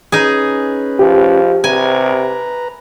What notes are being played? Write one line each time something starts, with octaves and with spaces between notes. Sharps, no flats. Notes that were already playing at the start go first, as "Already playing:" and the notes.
C#4 D#4 G#4 B4
F3 G4
C3 B4 G#5 A#5